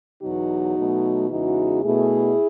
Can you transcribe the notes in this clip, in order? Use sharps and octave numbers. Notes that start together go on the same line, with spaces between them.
E2 B2 F#3 D#4 F#4
B2 F#3 A3
E2 C#3 E3 G#3 D#4 F#4
B2 A3 E4 G#4